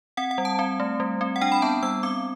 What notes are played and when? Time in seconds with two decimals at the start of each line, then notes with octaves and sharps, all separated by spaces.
0.17 C4 F#5
0.31 F#5
0.38 G3
0.45 A5
0.59 C4
0.80 A3
1.00 G3
1.21 C4
1.36 F#5
1.41 D4 G5
1.52 B5
1.62 B3 A5
1.83 G3 E6
2.03 C4 D6